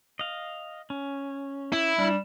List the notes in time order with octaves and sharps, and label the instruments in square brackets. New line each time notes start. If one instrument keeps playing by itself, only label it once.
[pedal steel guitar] D#5 F5
C#4
[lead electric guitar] E4
[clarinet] G3 [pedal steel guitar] D4